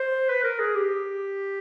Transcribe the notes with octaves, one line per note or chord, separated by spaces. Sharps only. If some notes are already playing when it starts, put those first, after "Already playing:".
Already playing: C5
B4
A#4
G#4
G4